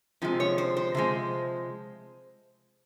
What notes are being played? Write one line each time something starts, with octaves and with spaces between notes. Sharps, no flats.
C3 F3 G#3
C#5
C5
C5
C3 F3 G#3